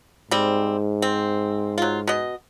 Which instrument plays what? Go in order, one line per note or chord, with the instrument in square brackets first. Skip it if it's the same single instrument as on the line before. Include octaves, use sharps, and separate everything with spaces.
[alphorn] G#2 [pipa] G3 C4
[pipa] C4
F#3 F4
B2 D#5